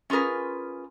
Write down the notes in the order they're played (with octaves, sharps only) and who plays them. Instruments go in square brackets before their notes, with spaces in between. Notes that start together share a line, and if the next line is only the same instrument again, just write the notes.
[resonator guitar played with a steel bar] C#4 F4 G#4 A#4 B4